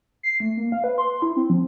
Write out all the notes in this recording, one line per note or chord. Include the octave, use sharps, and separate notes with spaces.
C7
A3
A#3
F5
B4
C6
E4
C4
F3